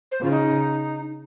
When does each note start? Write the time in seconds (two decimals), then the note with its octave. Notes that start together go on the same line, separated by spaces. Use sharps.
0.12 C5
0.21 C#3 F4
0.31 D#4